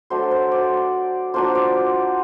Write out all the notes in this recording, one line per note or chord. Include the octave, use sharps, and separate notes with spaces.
F#3 A3 D4 C5
C5
D5
F#3 A#3 D4 F4 C5
D5